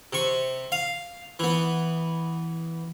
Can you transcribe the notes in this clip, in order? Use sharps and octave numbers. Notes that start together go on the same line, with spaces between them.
C3 C#6
F5
E3 B3